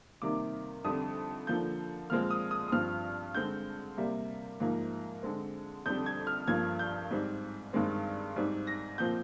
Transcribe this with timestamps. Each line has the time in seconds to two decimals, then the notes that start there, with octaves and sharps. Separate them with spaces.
0.22 C3 D#3 G3 A#3 D6
0.84 F2 D3 G3 D#6
1.47 D3 F3 A#3 G6
2.10 A#2 F3 G#3 C4 F6
2.30 D#6
2.51 D#6
2.68 D#6
2.72 G2 F3 C4 F6
3.34 D3 G#3 C4 G6
3.97 C3 G3 A#3
4.60 G#2 F3 A#3
5.23 D3 G#3 C4
5.86 F2 D3 G3 G6
6.06 G#6
6.27 F6
6.48 G2 F3 A#3 G#6
6.79 G6
7.10 G#2 G3 C4
7.73 G2 D#3 G#3 C4
8.36 G#2 G3 C4
8.67 A#6
8.98 A#2 F3 C4 G6